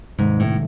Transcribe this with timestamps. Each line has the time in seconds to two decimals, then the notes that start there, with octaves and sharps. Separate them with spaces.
0.18 G#2 C3 D#3 G#3
0.40 A2